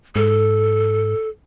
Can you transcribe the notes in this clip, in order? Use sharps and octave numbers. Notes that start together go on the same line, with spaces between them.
G#2 A4